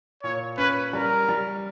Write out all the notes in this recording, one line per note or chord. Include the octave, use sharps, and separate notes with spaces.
A#2 C#5
C#4 B4
G3 A#4
G3